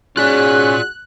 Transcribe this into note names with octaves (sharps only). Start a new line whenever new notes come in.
G#2 C#4 F4 F#4 G#4 D5 F#6